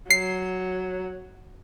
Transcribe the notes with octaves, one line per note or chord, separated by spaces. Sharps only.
F#3 C7